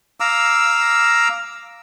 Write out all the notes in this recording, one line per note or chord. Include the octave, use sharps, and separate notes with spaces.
F5 A#5 D6 E6